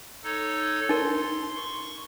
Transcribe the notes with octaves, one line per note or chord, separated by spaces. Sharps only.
D#4 A4 C#5
D#4 A#4 C6
C#6